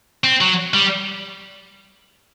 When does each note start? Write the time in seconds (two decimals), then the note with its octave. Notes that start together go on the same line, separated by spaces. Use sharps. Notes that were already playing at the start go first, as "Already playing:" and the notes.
0.24 C4
0.41 F#3
0.74 G3